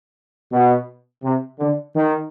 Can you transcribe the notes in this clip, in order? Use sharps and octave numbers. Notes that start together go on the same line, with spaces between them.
B2
C3
D3
D#3